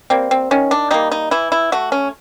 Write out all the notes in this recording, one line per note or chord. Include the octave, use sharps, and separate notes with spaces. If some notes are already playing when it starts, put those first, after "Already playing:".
G3 A#3 C4
C4
D#3 C#4
D4
G3 A#3 D#4
D#4
E3 E4
E4
A3 F#4
C#4